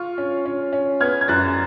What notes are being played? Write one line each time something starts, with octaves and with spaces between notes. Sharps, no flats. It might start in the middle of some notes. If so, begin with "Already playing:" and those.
Already playing: F4 C#6 F6
C#4
C#4
C#4
B3 F6 G#6
G#6
F#2 F#6 A6